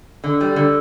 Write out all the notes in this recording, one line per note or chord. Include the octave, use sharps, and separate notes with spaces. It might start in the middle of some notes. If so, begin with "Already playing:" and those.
D3
G3
D3